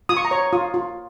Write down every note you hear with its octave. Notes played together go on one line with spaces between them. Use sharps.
F4 D#6
C#6
A#5
C#5 C#6
F4 D#6
F4